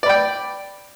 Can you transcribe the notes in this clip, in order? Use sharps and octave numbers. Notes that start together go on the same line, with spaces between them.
D5 G5 B5